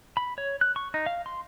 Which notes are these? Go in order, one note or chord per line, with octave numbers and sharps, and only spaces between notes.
B5
C#5
F#6
C#6
D#4
F5
C6